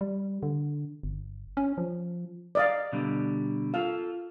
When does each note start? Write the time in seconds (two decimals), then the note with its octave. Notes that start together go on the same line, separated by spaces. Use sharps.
0.01 G3
0.43 D3
1.03 G1
1.57 C#4
1.78 F3
2.55 D5 D#5 F5
2.92 B2 D3 G3
3.74 F4 A4 F5